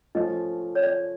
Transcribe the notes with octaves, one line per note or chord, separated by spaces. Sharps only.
F3 A3 C#4 D#5
C#5
D5